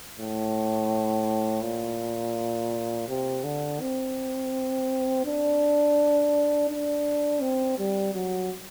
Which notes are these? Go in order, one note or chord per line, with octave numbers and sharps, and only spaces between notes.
A2
A#2
C3
D3
C4
D4
D4
C4
G3
F#3